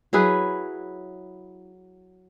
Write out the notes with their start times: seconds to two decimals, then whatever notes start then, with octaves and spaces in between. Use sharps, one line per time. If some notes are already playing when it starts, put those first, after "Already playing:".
0.13 F#3 E4 G#4 B4